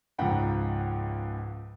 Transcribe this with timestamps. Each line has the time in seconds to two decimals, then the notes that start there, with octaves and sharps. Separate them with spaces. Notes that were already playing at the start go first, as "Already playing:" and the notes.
0.18 C#2 G#2 F3 F#5 G5 B5